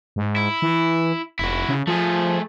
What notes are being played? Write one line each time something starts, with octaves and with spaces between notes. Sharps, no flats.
G#2
E4
E3
F1 E4 F#4
C#3
F3 A3 G#4